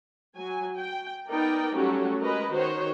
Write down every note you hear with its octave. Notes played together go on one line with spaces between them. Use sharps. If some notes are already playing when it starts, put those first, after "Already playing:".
F#3 G#5
G5
B3 D#4 A#4 D5 G5
F#3 G3 A3 C#4 F#4 G4
G#3 A#4 B4 D#5
D#3 F#4 C5 C#5